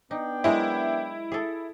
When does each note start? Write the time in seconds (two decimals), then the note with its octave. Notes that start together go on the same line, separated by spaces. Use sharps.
0.11 B3 D4 D#4 G5
0.44 F#3 G#3 E4 A#4
1.32 G#4 A4